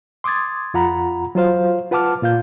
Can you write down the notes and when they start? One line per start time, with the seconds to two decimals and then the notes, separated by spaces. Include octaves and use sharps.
0.24 C6 D6 D#6 G#6 A6
0.74 F2 F4 F#5 A#5 B5
1.35 F#3 F4 C5 F5
1.91 F4 B4 F#5 A5 D6 F6
2.22 A#2 F4 F5 G6